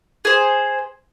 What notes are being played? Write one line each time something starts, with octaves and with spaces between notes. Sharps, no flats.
G#4 C5